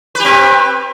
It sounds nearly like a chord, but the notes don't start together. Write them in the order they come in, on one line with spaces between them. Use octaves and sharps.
B4 G4 C4